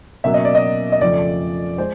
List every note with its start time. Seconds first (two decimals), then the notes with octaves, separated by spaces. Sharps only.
0.24 B2 F#3 A#3 C#4 E5
0.34 D#5
0.45 D5
0.55 D#5
0.92 D#5
1.01 F2 C#3 F3 A3 D5
1.78 G#3 C5